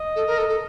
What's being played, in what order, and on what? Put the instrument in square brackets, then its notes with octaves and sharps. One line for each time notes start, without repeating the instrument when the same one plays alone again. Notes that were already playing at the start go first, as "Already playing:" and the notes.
Already playing: [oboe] D#5
[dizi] A4
A#4
A4
A4